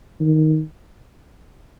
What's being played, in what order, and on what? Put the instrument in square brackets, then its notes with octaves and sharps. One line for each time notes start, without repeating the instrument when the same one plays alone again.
[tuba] D#3